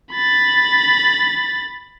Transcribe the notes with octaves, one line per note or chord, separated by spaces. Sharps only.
B5 A6